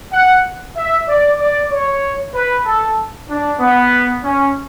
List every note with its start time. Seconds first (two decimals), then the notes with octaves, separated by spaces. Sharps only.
0.13 F#5
0.76 E5
1.08 D5
1.39 D5
1.71 C#5
2.34 B4
2.65 A4
3.29 D4
3.60 B3
4.24 C#4